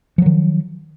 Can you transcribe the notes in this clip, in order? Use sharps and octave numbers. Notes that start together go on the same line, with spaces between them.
D#3 F3 F#3